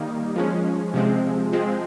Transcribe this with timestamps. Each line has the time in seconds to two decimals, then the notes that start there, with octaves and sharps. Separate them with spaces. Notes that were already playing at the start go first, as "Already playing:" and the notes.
Already playing: D#3 G3 A#3 D#4
0.36 F3 G#3 C#4
0.94 C3 F3 G#3 C4
1.53 F3 G#3 C4